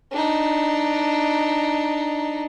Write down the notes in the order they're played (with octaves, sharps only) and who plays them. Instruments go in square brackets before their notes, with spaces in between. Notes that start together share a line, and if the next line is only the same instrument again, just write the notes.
[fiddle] D4 D#4